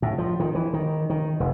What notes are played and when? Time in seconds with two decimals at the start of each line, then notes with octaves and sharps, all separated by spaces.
0.02 A2
0.18 F3
0.40 D#3
0.55 E3
0.73 D#3
1.10 D#3
1.40 F1